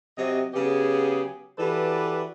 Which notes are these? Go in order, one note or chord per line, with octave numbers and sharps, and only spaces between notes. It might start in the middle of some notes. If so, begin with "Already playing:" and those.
C3 F#3 D#5
C#3 F#3 B3 G4 G#4
E3 F#4 G4 A4 B4 D5